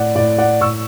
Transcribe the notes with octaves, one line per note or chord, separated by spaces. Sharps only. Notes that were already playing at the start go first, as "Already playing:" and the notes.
Already playing: A2 D5 F#5
A2 D5
D5 F#5
A2 C#6 E6